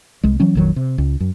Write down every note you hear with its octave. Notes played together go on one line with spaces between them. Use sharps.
C2 G#3
E3 F#3 C#4
A#1 F2 D#3 F#3
C3
C#2
F#2